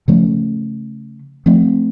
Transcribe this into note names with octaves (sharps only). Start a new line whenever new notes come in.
C#3 F3 A3 C#4
F3 A3 C4